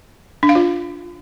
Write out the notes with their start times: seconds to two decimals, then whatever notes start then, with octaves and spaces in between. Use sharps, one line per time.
0.43 D4
0.49 F5
0.55 F4